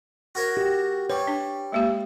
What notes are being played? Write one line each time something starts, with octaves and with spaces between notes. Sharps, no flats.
F#4 A#4 C#5
G4
G3 B4 C#5
D4
G#3 A#3 G4